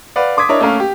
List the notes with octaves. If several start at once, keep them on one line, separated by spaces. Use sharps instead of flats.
B4 D5 F5 F#5
C6 D6 D#6 G#6 B6
D4 E4 A#4 C#5 D#5
A3 A#3 C#4 A#4 F5
G4